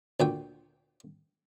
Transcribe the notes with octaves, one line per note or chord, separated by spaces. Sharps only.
D2 A#2 G5